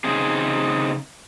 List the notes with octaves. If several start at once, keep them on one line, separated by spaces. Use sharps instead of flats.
C#3 C4 D#4 G#4